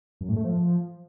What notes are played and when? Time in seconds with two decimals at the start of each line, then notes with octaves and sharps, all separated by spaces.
0.21 F#2
0.29 A2
0.36 A3
0.44 F3